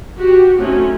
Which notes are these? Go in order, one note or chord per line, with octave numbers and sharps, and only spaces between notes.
F#4 G4
F#3 A3 C4 C#4 D#4